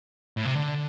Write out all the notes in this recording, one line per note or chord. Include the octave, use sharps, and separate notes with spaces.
A2
C3
D3